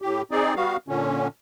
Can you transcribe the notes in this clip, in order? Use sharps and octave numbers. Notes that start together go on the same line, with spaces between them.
A2 G4
C4 D#4 G#4 D5
G3 B3 F#4 F5
A#2 D3 C#4